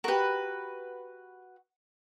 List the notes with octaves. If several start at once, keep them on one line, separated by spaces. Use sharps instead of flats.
F#4 G4 A#4 B4